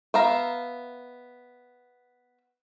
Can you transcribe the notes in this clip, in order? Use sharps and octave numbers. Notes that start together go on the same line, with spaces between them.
B3 E5 F5 A#5